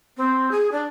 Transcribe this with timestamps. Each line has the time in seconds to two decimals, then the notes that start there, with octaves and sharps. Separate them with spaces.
0.17 C4
0.51 G#4
0.72 D4